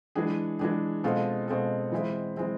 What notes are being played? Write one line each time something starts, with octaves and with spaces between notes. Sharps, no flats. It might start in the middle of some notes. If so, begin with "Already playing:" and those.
E3 G#3 D4 G#4
E3 G#3 D4 G#4
B2 G#3 C4 F4 A4
B2 G#3 C4 F4 A4
E3 G#3 C4 E4
E3 G#3 C4 E4